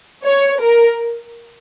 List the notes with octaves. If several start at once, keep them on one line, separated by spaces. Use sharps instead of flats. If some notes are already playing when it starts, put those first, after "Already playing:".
C#5
A#4